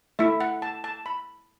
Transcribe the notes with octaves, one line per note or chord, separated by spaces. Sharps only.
A3 E4 E5
F#5
A5
A5
B5